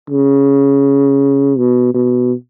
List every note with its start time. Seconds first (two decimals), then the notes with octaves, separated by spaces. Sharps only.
0.10 C#3
1.58 B2
1.94 B2